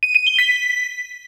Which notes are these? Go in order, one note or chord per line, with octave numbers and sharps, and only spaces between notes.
D#7
D#7
G7
B6